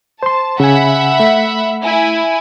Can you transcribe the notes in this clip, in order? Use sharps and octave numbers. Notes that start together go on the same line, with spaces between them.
C5 A5 C6
C#3 E5 F#5 G#5 B5
A3
E4 G#5